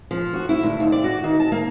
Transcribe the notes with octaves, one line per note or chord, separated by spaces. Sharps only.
F3
F#4
E4
D2
D#2
D5
F#4
D#3
A5
A#3